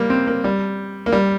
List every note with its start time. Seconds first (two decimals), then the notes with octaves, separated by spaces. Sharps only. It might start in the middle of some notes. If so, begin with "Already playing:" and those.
Already playing: G3 A#3
0.10 C4
0.27 A#3
0.44 G3
1.06 A#3
1.12 G3